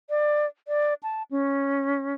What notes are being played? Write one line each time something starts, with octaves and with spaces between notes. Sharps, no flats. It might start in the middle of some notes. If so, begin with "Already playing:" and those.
D5
D5
A5
C#4